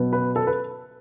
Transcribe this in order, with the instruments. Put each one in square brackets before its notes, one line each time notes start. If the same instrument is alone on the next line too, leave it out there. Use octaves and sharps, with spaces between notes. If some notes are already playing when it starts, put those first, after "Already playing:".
Already playing: [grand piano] B2 F#3 B3
B4
A4
B4